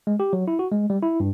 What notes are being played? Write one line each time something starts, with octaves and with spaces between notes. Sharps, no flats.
G#3
G4
F#3
E4
F#4
G#3
G3
E4
G2